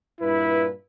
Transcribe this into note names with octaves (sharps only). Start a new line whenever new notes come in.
G2 A#2 E4 B4